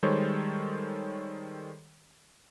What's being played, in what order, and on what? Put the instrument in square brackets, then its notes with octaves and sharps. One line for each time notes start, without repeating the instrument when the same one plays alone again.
[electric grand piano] D#3 G3 G#3 A4 C5 C#5